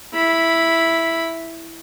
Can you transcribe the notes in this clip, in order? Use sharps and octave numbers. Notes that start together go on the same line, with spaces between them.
E4 B5